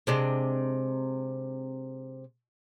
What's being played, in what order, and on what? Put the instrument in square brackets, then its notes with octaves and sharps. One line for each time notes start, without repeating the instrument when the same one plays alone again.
[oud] C3 G#3 D4